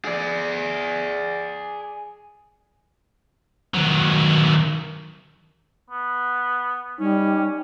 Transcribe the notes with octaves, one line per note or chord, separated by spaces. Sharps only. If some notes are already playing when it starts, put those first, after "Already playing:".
G#4 D5
D#3 F#3
B3
G3 C#4 D#4